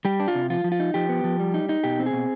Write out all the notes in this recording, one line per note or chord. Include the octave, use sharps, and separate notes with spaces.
G3 G4
D4
F4
C3
F3 F4
F3
F4
D#4
F3 G4
B3
F3
G3
D#4
D#4
B2 G4
C4
G#4
B2